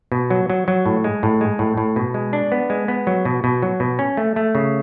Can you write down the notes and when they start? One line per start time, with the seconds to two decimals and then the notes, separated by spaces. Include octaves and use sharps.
0.12 B2
0.30 F#3
0.50 F#3
0.68 F#3
0.86 A2
1.04 G#3
1.23 A2
1.41 G#3
1.59 A2
1.77 A2
1.96 B2
2.14 G#3
2.33 D4
2.52 B3
2.70 G#3
2.88 B3
3.07 F#3
3.25 B2
3.44 B2
3.62 F#3
3.80 B2
3.99 C#4
4.17 A3
4.36 A3
4.55 C#3